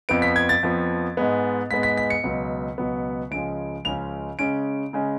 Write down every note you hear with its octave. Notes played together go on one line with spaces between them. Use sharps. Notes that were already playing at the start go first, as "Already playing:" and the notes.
F2 F3 B3 D7
B6
G#6
A6
F2 F3 B3
G#2 G#3 B3
G#2 G#3 B3 B6
B6
B6
C#7
C#2 B2 F#3 B3
C#2 B2 F#3 B3
C#2 C#3 F3 G#3 C#4 D7
C#2 C#3 F3 G#3 C#4 F7
C#3 G#3 C#4 D7
C#3 G#3 C#4